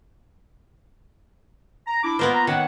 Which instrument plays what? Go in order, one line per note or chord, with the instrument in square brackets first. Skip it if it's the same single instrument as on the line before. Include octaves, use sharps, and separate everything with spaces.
[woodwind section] A#5
D4 E4 D6
[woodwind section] G#3 F4 A#4 [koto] A#3 B3 C5
[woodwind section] F4 A#5
[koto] D#3 [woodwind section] C#5 F#5